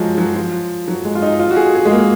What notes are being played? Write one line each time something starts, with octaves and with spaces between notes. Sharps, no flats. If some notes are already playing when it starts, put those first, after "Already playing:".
Already playing: F3 F#3 G#3
F#3
F3
F#3
G#3
F4
D#4
F4
F#4
G#4
G#4
G#3
A#3